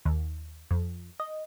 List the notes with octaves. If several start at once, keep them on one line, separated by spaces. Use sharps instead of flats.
D#2
F2
D#5